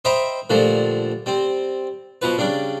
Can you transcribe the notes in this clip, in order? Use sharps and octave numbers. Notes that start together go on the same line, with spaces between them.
C5 D#5 E5 G5 A#5 B5
A#2 D3 F3 G3 A3
G3 C4
B2 F3 B4
C#3 G3 D4